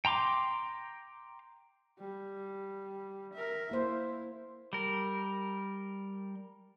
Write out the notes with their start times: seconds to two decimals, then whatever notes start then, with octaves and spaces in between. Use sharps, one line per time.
0.05 G5 A#5 C6 D6
1.99 G3
3.33 A#4 E5
3.71 A#3 E4 C5
4.73 G3 A#4